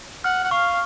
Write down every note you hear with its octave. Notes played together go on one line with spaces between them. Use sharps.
F#5 F6
F#5
F5 C#6